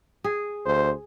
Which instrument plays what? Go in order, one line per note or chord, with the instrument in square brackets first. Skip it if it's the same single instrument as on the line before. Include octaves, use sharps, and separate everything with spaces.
[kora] G#4
[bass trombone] D2 [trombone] C5